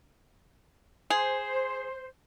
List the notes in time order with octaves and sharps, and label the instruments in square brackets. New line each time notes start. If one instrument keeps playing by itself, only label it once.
[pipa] G#4 [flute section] C5